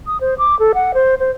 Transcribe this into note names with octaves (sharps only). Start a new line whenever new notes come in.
D#6
C5
D6
A4
F#5
C5
C5